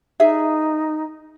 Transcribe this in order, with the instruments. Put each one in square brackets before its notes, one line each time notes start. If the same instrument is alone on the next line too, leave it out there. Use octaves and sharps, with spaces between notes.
[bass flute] D#4 [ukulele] G#4 E5